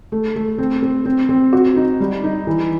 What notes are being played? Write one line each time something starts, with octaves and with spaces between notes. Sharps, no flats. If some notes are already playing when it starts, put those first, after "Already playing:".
A3
A3
C4
C4
C4
C4
F#4
D#4
G3
D#4
E3